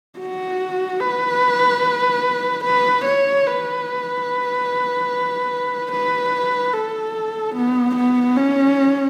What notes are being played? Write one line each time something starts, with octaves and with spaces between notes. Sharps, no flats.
F#4
B4
B4
C#5
B4
B4
A4
B3
B3
C#4